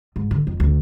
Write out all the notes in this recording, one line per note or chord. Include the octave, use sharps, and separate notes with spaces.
G#2
D3
F2
D2